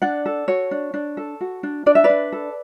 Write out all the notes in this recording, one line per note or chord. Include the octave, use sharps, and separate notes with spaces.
D4 D5 F#5
A4
F#4 C#5
D4
D4
A4
F#4
D4
D4 D5
E5
B4 D5
D4
A4